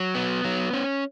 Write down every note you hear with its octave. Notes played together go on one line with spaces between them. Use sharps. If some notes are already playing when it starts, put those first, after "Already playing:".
Already playing: F#3
B3
F#3
C#4